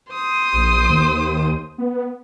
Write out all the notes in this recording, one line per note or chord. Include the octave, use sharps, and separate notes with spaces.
C5 D#6
A#1
D#2
B3